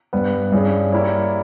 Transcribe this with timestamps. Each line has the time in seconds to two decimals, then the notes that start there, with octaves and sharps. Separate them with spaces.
0.13 G2 G3 B3
0.52 G2 G3 C#4 E4 G#4
0.92 G3 A#3 E4 A#4 C#5